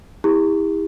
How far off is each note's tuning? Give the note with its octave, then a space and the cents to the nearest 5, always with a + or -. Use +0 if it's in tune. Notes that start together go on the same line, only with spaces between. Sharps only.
E4 -25 G4 +45